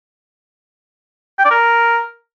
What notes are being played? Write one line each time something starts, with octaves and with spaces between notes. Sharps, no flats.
G5
D5
A#4